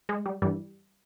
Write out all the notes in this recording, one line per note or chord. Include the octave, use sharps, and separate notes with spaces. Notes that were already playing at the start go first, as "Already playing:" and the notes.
G#3
G3
G2 E3 G3